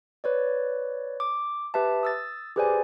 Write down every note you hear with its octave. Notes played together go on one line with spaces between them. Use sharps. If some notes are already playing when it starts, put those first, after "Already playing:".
B4 C#5 D5
D6
G4 B4 E5 A5
D#6 E6 A6
G4 G#4 B4 C5 D5 G#5